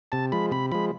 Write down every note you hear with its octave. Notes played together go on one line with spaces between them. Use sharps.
C3 A5
F3 G#3 B5
C3 B5
F3 G#3 B5